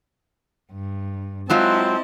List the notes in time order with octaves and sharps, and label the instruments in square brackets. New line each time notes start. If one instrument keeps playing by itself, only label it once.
[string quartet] G2
[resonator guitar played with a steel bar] F#3 G#3 F4 [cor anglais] C4 [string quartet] E4 D#5 A5